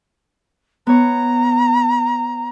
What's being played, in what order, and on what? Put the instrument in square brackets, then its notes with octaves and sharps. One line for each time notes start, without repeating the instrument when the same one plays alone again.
[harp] B3 C#5 [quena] A#5